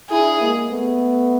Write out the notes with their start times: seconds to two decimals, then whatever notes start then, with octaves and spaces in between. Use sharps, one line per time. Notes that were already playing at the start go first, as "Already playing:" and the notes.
0.11 D4 E4 G#4
0.40 G#3 A#3
0.70 A3 B3